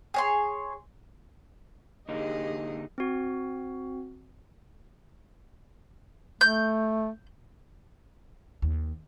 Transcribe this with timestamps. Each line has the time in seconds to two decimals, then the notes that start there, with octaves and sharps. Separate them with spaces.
0.14 G#4 C#5 C6
2.09 D3 A#3 D#4 G4 G#4 D#5
2.98 C4 F#4
6.41 A3 G6
8.62 D#2